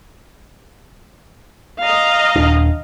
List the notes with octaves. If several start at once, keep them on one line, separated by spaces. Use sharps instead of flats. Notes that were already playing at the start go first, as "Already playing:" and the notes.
D#5 F5 A#5
D#1 D4